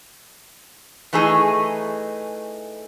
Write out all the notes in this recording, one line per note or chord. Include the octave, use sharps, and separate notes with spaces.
E3 A3 D#4 G#4